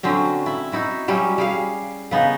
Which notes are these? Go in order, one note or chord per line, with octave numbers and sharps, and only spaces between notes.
D3 F#3 C4 C#4
E4
D#4 E4 F#4
F#3 G3 C#4 E4
G3 G#4 F5
C#3 B3 D#4